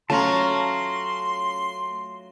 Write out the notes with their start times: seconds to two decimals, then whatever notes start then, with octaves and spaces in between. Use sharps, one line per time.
0.10 F#3 A3 C#4 F4 A5 A#5 C6